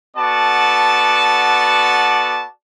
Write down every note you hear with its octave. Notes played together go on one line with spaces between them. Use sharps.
B3 F#4 A4 D5 A5